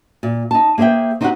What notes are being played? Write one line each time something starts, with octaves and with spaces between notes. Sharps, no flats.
A#2
D#4 A5
A#3 G#4 C5 E5 G5
C4 D#4 F#4 G4 C5 F#5